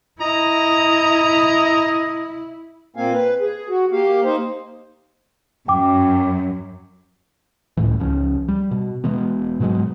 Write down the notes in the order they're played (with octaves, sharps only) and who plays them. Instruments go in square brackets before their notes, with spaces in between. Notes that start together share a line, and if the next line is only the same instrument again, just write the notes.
[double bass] E4 [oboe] D#5 [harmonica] A#5
[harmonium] A#2 A#3 C4 F5 G#5
B4
G#4
F#4
A#3 G4 F5
A#3 D#4 C5
[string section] F#2 [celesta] G5 D6
[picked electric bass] C#2 A2 E3
C#2 F3 C#4
G3
B2
B2 E3 G#3 B3
G#2 B2 F#3 G#3